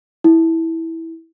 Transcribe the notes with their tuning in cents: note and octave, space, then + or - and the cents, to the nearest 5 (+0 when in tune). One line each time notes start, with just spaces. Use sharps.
E4 -10